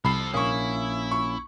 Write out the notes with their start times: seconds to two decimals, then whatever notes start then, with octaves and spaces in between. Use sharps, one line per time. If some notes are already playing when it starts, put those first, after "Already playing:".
0.05 C2 F3 A4 B5 C7
0.34 A#1 A#3 C#4 E4 C#6 D#6
1.11 C#6